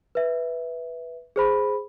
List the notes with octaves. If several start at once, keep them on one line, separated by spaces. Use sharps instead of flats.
B4 E5
G#4 C5 B5